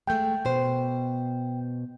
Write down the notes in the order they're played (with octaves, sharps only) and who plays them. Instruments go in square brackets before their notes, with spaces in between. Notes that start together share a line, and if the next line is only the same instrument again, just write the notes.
[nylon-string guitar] G#3 A3 [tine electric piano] G5 G6
[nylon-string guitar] B2 C5